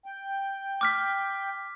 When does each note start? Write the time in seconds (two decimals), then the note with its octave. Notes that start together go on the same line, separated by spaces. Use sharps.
0.06 G5
0.81 D6 F6 B6